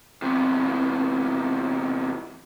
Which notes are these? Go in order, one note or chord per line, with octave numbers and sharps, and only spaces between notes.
E2 C3